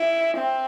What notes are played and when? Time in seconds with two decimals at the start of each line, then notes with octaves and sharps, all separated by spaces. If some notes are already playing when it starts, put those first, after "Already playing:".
Already playing: E4
0.37 C4